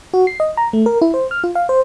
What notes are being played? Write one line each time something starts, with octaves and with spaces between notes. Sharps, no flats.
F#4
C7
D#5
A#5
A3
A#4
E4
C5
F6
F4
F5
C5